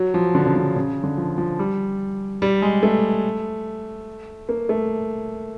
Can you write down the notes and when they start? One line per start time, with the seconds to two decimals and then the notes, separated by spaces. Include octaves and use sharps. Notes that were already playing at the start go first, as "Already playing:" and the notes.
Already playing: F#3
0.14 F3
0.35 D3
0.46 C#3
0.56 D3
0.76 C#3
1.03 D3
1.17 F3
1.38 F3
1.59 G3
2.42 G3
2.62 G#3
2.83 A3
4.49 A#3
4.69 A3